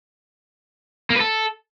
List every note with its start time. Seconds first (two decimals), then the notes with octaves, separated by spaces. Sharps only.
1.10 A#3
1.15 B4
1.20 A4